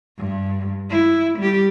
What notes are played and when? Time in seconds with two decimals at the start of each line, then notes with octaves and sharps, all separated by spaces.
0.18 G2
0.90 E4
1.39 G3 G4